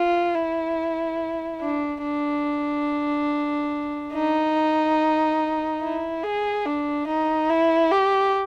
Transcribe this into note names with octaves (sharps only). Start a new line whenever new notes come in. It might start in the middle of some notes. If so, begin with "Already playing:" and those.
Already playing: F4
E4
D4
D4
D#4
E4
G#4
D4
D#4
E4
G4